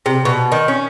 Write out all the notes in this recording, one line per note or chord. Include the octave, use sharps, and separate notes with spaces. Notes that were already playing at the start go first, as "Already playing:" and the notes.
C3
B2
D#3
C#4